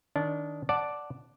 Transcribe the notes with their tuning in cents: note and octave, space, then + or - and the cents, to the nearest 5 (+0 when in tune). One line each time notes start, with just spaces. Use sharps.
D#3 +0 D4 -20
D5 +0 F#5 +0 A5 +0